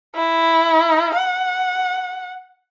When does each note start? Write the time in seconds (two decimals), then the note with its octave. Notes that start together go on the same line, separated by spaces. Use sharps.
0.16 E4
1.16 F#5